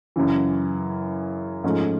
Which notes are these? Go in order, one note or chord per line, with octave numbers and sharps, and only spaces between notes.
F#2 C#3 E3
G#2 F3 A3 C#4